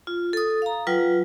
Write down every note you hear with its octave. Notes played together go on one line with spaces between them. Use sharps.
F4
A4 D#6
F5 A#5
F#3 F4 B4 F#5 G5